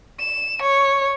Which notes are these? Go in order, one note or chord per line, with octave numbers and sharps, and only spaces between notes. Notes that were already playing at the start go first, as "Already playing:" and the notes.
E7
C#5